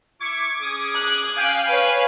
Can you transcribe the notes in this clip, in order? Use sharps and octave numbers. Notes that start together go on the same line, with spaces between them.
E4 C#6 D6 G#6
C#4 G#4 D6 D#6 G#6
F#6
C#4 F5 G5 G#5 D#7
B4 C#5